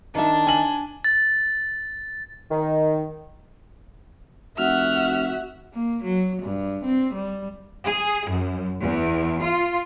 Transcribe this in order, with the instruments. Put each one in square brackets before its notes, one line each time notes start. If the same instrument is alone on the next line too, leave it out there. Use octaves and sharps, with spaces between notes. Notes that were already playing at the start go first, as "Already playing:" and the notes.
[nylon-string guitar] D#3 E5 [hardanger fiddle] D4
[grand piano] G#5 F#7
[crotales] A6
[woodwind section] D#3
[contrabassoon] F1 [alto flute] F#4 [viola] E5 F#5 [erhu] F6
[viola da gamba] A#3
F#3
G2
C4
G3
[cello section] G#4
F#2
E2
F4